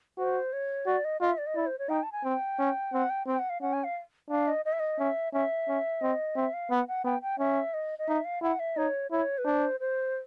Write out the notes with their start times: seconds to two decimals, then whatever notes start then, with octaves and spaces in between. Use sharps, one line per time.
0.18 F#4 C5
0.53 C#5
0.87 F#4 D5
1.05 D#5
1.21 F4 D#5
1.29 E5
1.38 D5
1.46 D#5
1.56 E4 D5
1.66 C5
1.79 C#5
1.89 D#4 G5
2.03 A5
2.12 G#5
2.24 C4 G5
2.59 C#4
2.93 C4 F#5
3.10 G5
3.27 C4 G5
3.39 F#5
3.50 F5
3.61 C#4 F#5
3.73 G#5
3.84 F5
4.30 D4 F5
4.48 D#5
4.65 D#5
4.73 E5
4.80 D#5
4.99 C#4 E5
5.33 C#4 E5
5.68 C#4
6.01 C4 D#5
6.36 C4 E5
6.53 F5
6.71 B3 F#5
6.88 F#5
7.04 B3 G5
7.22 G5
7.39 C#4 E5
7.74 D#5
7.99 D#5
8.08 D#4 E5
8.25 F5
8.42 E4 F#5
8.59 E5
8.77 D#4 C#5
9.11 E4 C#5
9.38 B4
9.45 D4 C5
9.80 C5